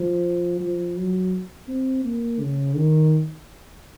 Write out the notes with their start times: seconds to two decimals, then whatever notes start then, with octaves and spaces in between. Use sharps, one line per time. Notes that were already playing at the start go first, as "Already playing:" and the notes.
Already playing: F3
0.60 F3
0.97 F#3
1.68 C4
2.05 A#3
2.40 C#3
2.76 D#3